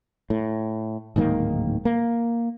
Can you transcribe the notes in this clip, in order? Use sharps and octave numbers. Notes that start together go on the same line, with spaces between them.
A2
D1 G#2 D#3 A#3
A#3